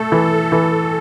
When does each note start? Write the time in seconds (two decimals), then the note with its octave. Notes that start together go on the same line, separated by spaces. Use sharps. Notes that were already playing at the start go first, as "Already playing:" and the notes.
Already playing: A3 A4
0.12 E3
0.52 E3